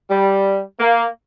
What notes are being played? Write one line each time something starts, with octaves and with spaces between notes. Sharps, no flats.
G3
A#3